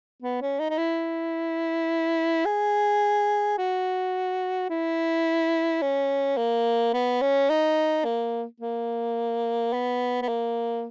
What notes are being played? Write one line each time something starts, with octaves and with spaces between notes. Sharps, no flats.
B3
C#4
D#4
D#4
E4
G#4
F#4
E4
C#4
A#3
B3
C#4
D#4
A#3
A#3
B3
B3
A#3